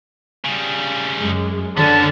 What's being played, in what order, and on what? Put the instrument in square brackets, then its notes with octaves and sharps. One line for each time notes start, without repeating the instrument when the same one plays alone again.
[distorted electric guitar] C#3 G3
[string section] F#2 G#3
[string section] D3 [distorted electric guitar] B3 C#4 [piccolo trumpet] A5